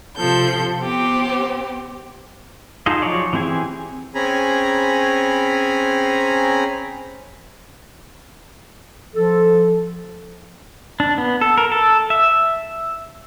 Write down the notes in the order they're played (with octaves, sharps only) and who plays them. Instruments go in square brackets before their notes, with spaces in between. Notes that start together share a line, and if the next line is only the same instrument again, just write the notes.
[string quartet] C3 F3 A4 G6
B3 C4 G4
[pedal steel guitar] D#4 F4 G#4 A4 D#5
F3 F#3 G#4 C#5 D5
E3 C4 G4 G#4 G#5
[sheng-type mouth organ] C4 C#4 G#4 G#5 A#5 B5
[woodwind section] F3 A4
[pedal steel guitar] D4
B3
A4
A#4
A4
E5